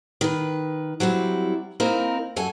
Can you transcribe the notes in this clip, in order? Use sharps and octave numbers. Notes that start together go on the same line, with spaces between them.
D#3 B4
F#3 G3 C4 E4
A#3 C4 D#4 E4 A#4
F#2 A4 G#5